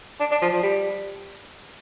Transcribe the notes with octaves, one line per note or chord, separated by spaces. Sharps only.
D4
D4
F3
F3
G3